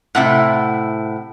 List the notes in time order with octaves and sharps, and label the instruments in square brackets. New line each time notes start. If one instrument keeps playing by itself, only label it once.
[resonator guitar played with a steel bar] A2 C3 E4 [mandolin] F#5